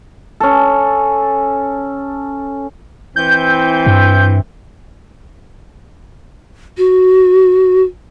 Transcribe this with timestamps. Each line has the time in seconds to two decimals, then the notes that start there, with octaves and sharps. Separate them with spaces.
0.40 C#4 A4
3.16 E3 C4 G6
3.86 G2
6.78 F#4